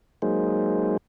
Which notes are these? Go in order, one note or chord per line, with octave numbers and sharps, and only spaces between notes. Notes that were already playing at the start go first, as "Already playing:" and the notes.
F#3 G#3 A#3 D#4 G#4 C5